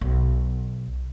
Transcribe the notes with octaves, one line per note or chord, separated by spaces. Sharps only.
B1